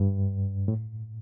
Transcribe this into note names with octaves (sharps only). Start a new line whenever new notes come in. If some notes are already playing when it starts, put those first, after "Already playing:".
Already playing: G2
A2